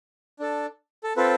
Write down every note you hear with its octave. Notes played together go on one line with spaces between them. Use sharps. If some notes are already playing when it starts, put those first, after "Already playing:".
D4 A4
A4
C4 F4 A4 B4